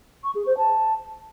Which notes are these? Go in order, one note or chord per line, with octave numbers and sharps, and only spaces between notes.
C#6
G#4
C5
A5